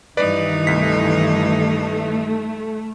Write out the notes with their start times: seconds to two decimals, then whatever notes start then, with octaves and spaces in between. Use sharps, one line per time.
0.17 G2 D#3 E3 D#4 B4 D5
0.67 C2 A3 B6